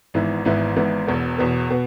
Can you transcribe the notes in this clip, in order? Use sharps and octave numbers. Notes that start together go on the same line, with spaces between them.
G#1 G#2 E3 B3 E4
G#1 G#2 E3 B3 E4
G#1 G#2 E3 B3 E4
E1 E2 B2 B3
E1 E2 B2 B3
B2 B3